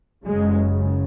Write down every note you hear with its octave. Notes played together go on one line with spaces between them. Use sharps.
F#1 F#2 C#3 G#3